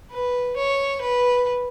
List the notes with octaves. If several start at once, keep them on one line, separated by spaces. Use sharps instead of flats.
B4
C#5
B4